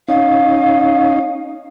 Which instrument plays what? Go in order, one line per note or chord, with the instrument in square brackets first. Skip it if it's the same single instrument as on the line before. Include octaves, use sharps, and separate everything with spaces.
[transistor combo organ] C#4 D#4 [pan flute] F5